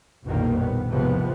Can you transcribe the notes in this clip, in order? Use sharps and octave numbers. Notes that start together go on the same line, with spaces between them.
A#1 F2 B2 D#3 G3 A#3
B3
A#1 E2 G#2 C3 F3 B3